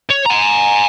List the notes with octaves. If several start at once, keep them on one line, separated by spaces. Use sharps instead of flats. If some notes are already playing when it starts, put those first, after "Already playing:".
C#5
G#5 A#5